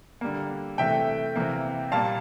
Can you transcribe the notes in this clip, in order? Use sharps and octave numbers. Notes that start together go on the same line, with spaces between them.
D3 G3 A#3
C3 E3 A3 E5 G5
C3 E3 A#3
A#2 G3 A#3 F5 A5